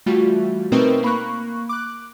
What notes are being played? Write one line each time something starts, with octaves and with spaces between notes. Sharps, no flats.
E3 G3 A3 F4 F#4
B2 A3 C4 D#4 A#4 B4
A#3 B5 C#6 F#6
D6 F#6